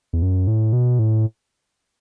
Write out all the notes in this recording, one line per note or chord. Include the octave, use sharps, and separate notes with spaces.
E2
F#2
A2
B2
A2